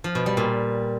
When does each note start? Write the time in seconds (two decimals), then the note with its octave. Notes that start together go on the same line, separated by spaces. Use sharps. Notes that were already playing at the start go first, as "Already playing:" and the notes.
0.04 F3
0.15 B2
0.26 G3
0.37 A#2